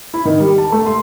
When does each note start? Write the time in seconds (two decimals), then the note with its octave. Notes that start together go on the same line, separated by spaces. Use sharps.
0.14 E4
0.25 D#3
0.40 G3
0.58 A5
0.72 A3
0.86 C6